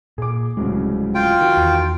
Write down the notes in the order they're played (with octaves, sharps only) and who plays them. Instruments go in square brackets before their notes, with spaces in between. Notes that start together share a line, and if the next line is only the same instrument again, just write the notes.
[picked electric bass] A#2 [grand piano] G#4 D6
[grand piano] D1 C2 C#3 [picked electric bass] G#3
[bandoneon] F4 G5
[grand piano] D#3 F#4
[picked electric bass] E2